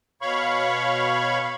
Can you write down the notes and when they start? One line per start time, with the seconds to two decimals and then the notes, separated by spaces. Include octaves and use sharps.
0.22 B2 C#5 F5 B5 C#6